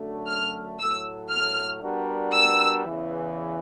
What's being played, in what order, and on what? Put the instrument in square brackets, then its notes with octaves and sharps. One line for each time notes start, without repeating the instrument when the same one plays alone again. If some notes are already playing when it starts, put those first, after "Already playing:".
Already playing: [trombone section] F#2 D3 F#3 A3 D4
[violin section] F6
[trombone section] A2 F#3 A3 [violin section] E6
[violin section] F6
[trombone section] G3 B3 D4 F#4 A#4
[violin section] E6
[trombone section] E2 C#3 E3